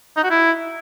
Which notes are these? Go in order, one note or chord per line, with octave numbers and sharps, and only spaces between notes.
D#4
F#4
E4